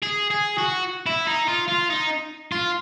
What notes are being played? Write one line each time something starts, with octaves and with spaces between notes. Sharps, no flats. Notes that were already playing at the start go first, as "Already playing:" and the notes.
G#4
G#4
F#4
E4
D#4
F4
F4
D#4
F4